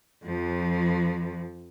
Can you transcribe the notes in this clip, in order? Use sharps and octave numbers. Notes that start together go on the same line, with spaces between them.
F2 F3